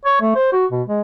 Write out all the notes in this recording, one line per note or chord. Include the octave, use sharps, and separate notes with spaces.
C#5
A3
C5
F#4
B2
G#3